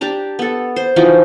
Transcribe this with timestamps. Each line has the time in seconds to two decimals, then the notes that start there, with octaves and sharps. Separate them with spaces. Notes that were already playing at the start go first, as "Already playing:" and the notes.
0.01 D4 G4 A5 A#5
0.39 B3 A4
0.76 C5
0.96 E3 F3 D#4 F#4